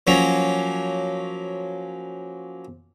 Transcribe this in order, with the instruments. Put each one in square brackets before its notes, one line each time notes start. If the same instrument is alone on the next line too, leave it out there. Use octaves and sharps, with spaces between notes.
[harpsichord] F3 F#3 A#3 C#4